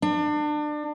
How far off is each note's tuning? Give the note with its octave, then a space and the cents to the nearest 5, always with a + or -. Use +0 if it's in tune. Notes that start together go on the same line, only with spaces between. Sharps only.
D4 +30